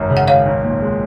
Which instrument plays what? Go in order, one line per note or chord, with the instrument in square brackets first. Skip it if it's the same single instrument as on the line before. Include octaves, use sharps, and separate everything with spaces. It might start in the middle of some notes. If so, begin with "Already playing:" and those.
Already playing: [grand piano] G#1 F#2
C#3
[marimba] F#5
[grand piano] G#1 [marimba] C#5 F5
[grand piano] B1
A#2
G#3